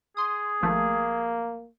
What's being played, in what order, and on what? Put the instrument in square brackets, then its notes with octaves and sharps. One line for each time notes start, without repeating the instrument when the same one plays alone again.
[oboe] G#4 [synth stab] C6 D#6
[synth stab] G#1 F3 A3 [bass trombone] A#3